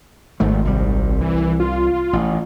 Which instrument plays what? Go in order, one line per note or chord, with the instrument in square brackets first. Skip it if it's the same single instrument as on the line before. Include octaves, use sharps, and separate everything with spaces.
[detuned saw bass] G#1 [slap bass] G#2 D#3 A3
[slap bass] C2 G3
[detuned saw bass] E3
F4
[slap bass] A1